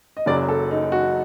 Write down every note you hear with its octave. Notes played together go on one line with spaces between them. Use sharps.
D#5
F#1 F#2 F#3 D5
A4
D#4
F#4